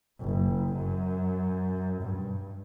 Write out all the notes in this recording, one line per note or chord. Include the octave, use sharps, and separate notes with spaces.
F#1
F#2
G2